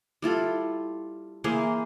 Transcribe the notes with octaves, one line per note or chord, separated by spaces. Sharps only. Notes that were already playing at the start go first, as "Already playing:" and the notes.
G3 E4 F4 A4
E3 A#3 G#4 C5